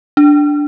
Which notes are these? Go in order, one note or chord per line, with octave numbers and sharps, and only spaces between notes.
D4